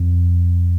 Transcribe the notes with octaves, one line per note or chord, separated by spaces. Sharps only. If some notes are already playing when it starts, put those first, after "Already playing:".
Already playing: F2